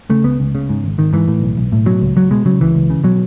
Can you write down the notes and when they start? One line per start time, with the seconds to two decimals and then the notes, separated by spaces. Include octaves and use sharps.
0.10 C#3 A3
0.24 C#2 B3
0.40 C#2
0.55 C#3
0.69 G#2
0.84 G#1
0.98 G#1 D#3
1.13 G#2 E3
1.28 A2
1.42 B1
1.57 B1
1.72 A2
1.86 B2 F#3
2.01 C#2
2.16 C#2 F#3
2.31 B2 G#3
2.45 C#3 F#3
2.61 C#2 E3
2.75 C#2
2.90 C#3
3.04 B2 F#3